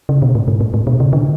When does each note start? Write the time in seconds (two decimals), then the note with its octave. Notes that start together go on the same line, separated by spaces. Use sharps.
0.09 C#3
0.22 B2
0.35 A2
0.48 G#2
0.61 A2
0.74 A2
0.87 B2
1.00 C#3
1.13 D3